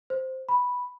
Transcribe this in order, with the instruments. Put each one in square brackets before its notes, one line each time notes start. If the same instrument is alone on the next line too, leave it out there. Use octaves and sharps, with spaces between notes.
[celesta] C5
B5